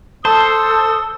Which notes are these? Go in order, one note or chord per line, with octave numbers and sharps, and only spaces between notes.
A4 C5 A5 D#6 E6